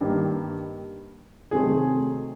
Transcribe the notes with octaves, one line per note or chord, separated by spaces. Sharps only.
G2 D#3 G3 A#3
C3 D#3 F#3 A3 C4 G#4